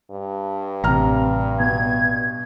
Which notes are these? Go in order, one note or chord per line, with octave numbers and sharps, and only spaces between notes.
G2
A1 C3 A#5 F6
B2 G#6